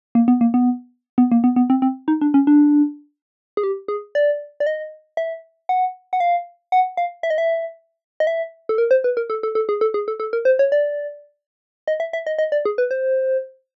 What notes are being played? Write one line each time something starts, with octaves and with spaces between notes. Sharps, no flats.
A#3
B3
A#3
B3
B3
A#3
B3
B3
C4
C4
D#4
D4
C#4
D4
G#4
G4
G#4
D5
D5
D#5
E5
F#5
F#5
F5
F#5
F5
E5
D#5
E5
D#5
E5
A4
A#4
C5
B4
A#4
A4
A4
A4
G#4
A4
G#4
A4
A4
A#4
C5
C#5
D5
D#5
E5
E5
D#5
D#5
D5
G#4
B4
C5